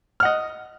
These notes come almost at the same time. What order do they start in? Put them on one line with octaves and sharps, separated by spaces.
F6 F#5 D#5